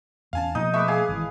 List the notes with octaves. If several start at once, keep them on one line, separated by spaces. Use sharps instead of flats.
E2 C#4 F5 G#5 A5
B2 F3 A#3 D#4 D#6
A3 B4 E5 D6
G#4 F5 G#5
G#1 C3 E3